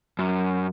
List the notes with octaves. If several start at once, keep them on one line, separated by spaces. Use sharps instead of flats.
F#2